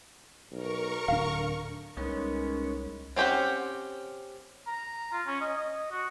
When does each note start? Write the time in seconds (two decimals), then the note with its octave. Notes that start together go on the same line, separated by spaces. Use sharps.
0.52 B1 A#4 C#6
1.08 D1 D3 D4 F5
1.97 C2 G#3 B3 C#4 D#4 A#4 B5
3.16 C4 C#4 G4 C5 F#5
4.67 A#5
5.12 F4
5.27 C#4
5.41 D#5
5.57 D#5
5.91 F#4